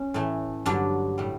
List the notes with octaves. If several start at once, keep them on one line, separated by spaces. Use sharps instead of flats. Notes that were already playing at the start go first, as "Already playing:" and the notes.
Already playing: C#4
A2 E3 A3
G2 D3 F#3 D4
A2 G3